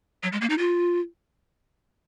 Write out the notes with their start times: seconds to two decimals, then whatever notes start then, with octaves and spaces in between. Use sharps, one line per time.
0.23 F#3
0.33 G#3
0.41 A#3
0.50 D#4
0.58 F4